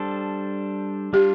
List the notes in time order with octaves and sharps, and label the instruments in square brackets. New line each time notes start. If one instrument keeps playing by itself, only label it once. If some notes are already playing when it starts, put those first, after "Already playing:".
Already playing: [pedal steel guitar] G3 D4 A4 C5
[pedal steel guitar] G3 D4 F4 [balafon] G4